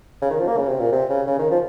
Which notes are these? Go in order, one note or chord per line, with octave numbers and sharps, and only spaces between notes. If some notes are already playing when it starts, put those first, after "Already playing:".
C#3
D#3
F3
A#3
C#3
C3
A#2
C3
C#3
C#3
D#3
F3